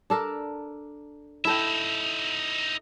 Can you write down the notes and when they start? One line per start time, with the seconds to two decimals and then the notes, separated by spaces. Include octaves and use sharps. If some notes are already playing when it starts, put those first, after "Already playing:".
0.10 D4 A4 A#4
1.45 D#4 E4 A4 E5 G5